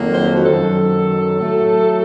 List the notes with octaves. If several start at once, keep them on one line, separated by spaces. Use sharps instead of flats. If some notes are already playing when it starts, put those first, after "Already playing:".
Already playing: F2 D#3 F#3 A#3
C5
F#4
F#2 D#3 F#3 A4
A2 F#3 A3